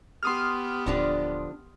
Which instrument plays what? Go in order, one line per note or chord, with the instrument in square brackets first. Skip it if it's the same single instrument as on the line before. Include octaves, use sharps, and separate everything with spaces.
[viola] B3 G4 [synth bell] C6 D#6 F6
[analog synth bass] D1 [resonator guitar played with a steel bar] D3 F3 D4